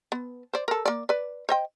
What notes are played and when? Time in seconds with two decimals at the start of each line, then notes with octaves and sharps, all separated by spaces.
0.12 B3
0.53 C5 D5
0.68 A4 A#4
0.85 A#3 D5
1.09 B4 D5
1.49 C5 D#5 G5